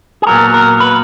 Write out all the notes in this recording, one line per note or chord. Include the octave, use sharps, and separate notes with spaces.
G#4
A#2 F#3 B3 A#4
A#4
B4